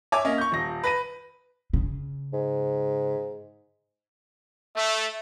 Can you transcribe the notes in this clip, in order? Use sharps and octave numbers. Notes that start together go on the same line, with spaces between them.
C#5 E5 G#5 D6
A#3 C#4 D#5
C#6 G6
D#1 A#6
B4 A#6 D#7
C#3
G#2
A3 E5